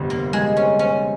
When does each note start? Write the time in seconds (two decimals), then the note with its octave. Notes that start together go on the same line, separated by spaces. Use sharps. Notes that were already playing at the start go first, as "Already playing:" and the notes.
Already playing: G1 F2 C3 G3 C4
0.10 A#3
0.33 G#3
0.57 C#4
0.79 C#4